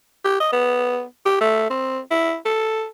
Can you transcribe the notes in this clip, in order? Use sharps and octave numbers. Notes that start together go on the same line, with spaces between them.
G4
D#5
B3
G4
A3
C4
E4
A4